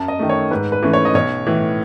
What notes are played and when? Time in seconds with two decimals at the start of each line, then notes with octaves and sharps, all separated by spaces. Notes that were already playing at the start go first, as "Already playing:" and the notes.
Already playing: F#2 A5
0.08 D#5
0.19 D#3 A3
0.29 C#5
0.51 G#2 B4
0.72 B4
0.83 E3 A3 C#4
0.93 C#5
1.05 D#5
1.14 B1 C#5
1.47 A2 E3